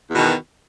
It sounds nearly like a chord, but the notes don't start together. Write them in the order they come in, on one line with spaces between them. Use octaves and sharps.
E2 B2 D#3